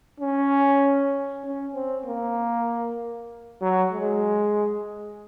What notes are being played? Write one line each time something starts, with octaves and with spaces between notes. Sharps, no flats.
C#4
C#4
C4
A#3
F#3
G#3